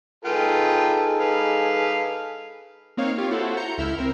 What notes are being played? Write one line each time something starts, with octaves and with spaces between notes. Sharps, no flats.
D#4 F4 G#4 A4 B4 G5
B4 F5
A#3 C4 D#4 C#5 F5
F4 G4 C#5 F5
E4 F#4 A4 C5
A#5 G6 C#7
C#2 E4 E6 F6 G6
C4 A#4